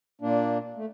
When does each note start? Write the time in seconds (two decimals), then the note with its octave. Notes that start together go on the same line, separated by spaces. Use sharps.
0.21 A#2 A#3 D4
0.77 A3